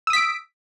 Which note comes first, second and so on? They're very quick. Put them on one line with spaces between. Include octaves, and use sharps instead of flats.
E6 D#6 B6 D7